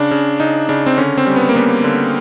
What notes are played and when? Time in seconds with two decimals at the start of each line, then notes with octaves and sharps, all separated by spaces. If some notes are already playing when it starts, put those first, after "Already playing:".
Already playing: C#3 D4
0.11 C#3
0.40 C#3 D#4
0.69 C#3 D4
0.86 C4
0.97 D3 C#4
1.18 C4
1.27 G3
1.36 B3
1.49 A#3
1.56 G3 B3
1.84 D3